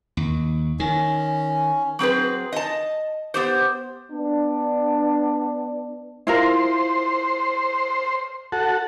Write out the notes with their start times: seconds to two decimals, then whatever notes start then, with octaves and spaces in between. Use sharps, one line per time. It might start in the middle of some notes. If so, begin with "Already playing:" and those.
0.17 D#2
0.80 D#3 C#4
1.99 F#3 C4 G#4 B4
2.53 D#5 A5
3.34 B3 G4 C5
4.11 B3 D4
6.27 E4 F4 A#4 C5
8.52 F#4 A4